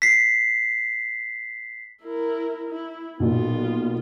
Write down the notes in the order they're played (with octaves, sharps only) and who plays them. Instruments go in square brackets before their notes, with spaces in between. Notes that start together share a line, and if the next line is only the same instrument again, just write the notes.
[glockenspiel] B6 C7
[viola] E4 A#4
E4
[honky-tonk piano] B1 A#2 [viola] B3 F4